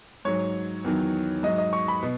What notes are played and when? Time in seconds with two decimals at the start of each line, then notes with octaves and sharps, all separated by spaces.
0.25 G#2 F#3 C#5
0.84 E2 D#3 F#3
1.43 G#2 F#3 D#5
1.58 D#5
1.73 C#6
1.88 B5
2.02 B2